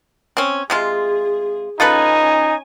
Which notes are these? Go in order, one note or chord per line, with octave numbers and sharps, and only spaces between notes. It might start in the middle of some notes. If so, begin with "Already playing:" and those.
C4 C#4
C3 G#3 F4 G#4
C#4 D#4 F4 A4 B4 G#5